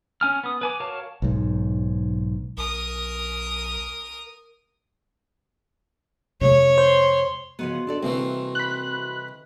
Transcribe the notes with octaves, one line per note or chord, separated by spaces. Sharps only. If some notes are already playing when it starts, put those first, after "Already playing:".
C#4 G#5 F6
B3 D#6
B4 G#5 D6
F#4 A#4 C#5 F5 A5
B1 G#2
B1 A#4 D#6
F2 C3 G#3 C#5
C5 C6
C#3 F3 B3 F#4 D#5 C6
D4 A4 D5
C2 E3 A3 A#3 C4
B5 F#6